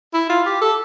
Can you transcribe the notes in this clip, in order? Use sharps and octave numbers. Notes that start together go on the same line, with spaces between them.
E4
F4
G4
A4